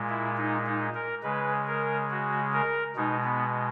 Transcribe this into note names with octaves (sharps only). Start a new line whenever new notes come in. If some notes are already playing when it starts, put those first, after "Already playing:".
Already playing: A#2 G#3
E4
D#4
D#4
A#4
C#3 G#3 B4
A#4
F#4
A#4
B2 G#3 D#4
B3